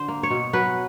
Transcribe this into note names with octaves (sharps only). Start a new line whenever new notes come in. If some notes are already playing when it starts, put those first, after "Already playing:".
Already playing: D3 C5
A#3
C#5
B2
F#3 B4